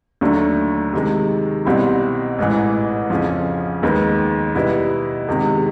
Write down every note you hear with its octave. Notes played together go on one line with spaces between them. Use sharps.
D#2 D3 F#3 A3 D4
C3 D#3 G#3
C2 B2 G3 C4 E4
A1 G#2 E3
F2 C#3 F3
D#2 D#3 G#3 B3
B2 G3 B3 E4
E2 C3 D#3 G#3